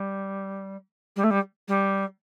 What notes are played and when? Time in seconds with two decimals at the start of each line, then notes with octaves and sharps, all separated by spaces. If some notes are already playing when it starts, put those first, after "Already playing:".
Already playing: G3
1.16 G3
1.24 A3
1.30 G3
1.68 G3